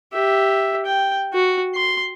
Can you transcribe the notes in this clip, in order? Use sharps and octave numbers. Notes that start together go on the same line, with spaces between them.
G4 E5
G5
F#4
C6